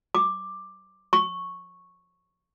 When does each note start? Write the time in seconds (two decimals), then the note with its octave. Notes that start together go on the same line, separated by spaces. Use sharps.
0.15 D6
1.13 C#6